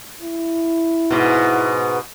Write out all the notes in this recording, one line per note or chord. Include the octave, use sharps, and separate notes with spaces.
E4
G#2 B2